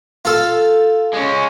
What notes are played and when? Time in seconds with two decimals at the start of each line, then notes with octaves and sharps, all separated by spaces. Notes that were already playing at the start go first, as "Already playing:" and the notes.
0.25 F4 A4
1.14 G#3 C#4